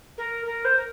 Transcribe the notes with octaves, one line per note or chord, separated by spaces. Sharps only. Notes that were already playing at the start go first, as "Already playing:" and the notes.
A#4
A#4
C5
A#4